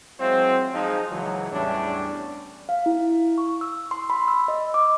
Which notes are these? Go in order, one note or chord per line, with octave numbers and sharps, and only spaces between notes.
F#3 G#3 C4 E4 F4 C5
F3 G#3 D#4
C#2 E3 F#3
E2 A2 G3 C#4 D4
F5
E4
C#6
E6
C6
B5
E6
D#5
D6